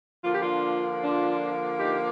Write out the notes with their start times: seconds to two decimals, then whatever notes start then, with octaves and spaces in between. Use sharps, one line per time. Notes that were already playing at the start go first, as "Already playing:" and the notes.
0.24 D3 F3 A#3 F4
0.34 G4
0.42 D4 F4
1.01 D4 F4
1.78 D#4 G4